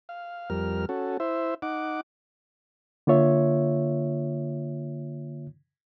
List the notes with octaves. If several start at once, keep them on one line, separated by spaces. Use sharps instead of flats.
F5
F2 G3 A#4 F6
C#4 F#4 A4
E4 C5 E5
D#4 F#5 D6
D3 A#3 F4 C#5 E5